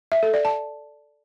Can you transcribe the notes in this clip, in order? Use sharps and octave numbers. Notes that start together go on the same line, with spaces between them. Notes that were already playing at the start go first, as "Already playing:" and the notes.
E5
A4
D5
A5